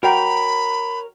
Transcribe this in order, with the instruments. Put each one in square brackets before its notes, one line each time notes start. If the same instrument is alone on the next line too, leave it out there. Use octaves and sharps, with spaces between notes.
[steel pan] F#4 G5 [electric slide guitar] A#4 C#5 A#5 [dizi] B5